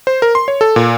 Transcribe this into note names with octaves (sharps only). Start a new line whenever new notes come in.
C5
A#4
C6
C#5
A4
A#2